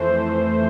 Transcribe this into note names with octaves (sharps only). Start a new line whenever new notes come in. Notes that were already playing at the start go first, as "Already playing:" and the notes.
Already playing: F2 E3 A3 C5